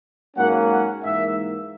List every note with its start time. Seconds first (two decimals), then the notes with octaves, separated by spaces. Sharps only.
0.37 G#2 F#3 A#3 C#4 F#5
0.71 F#5
1.04 G#2 E3 A#3 E5